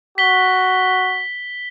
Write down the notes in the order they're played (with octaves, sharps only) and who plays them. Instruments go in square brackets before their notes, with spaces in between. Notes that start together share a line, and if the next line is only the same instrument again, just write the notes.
[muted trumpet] F#4 [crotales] B6 G7